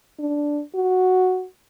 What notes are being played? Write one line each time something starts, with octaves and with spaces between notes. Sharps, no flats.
D4
F#4